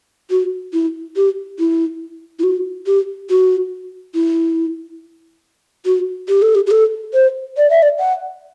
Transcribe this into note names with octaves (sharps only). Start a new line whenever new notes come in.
F#4
E4
G4
E4
E4
F#4
G4
F#4
E4
F#4
G4
A4
G4
G4
A4
C5
D5
E5
D5
F#5